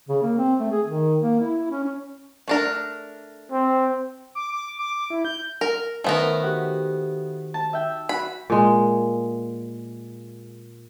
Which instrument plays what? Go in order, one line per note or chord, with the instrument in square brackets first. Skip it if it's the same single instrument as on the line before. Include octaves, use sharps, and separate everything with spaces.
[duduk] C#3
A#3
C4
A3
G#4
D#3
A#3
E4
C#4
C#4
[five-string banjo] A3 D4 A#4
[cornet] C4
[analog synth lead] D6
D6
D6
E4
G6
[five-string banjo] A#4
[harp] D#3 C5 [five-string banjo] A3 B3 A#4
[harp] F#4 G4 F#5
A5
E5 G5
[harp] F#4 [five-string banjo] B5
[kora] A#2 G#3